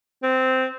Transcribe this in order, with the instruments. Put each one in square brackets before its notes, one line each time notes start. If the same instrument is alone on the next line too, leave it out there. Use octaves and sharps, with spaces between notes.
[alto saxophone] C4